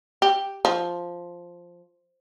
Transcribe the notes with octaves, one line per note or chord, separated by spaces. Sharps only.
G4
F3